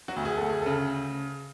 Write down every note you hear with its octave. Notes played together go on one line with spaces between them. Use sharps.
F#3 F#4
D2
G#4
D2 A4
G#4
C#3 A4